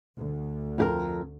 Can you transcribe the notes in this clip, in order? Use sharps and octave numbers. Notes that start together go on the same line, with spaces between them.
D2
F2 G4 A#4